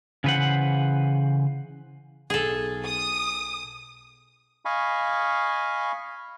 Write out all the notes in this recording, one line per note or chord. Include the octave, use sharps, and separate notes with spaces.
C#3 E3 B4 C5 F#5
B1 G#4 A4
D#6
D#5 F5 G#5 B5 C#6